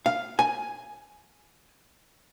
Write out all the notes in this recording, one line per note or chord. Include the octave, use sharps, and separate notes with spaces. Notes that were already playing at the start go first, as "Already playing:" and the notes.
F5
G#5